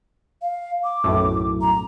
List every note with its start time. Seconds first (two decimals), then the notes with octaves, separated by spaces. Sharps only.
0.42 F5
0.84 D6
1.04 B1 F#2 A2
1.61 A#5